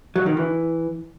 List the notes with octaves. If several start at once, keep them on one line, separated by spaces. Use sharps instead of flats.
F#3
D#3
E3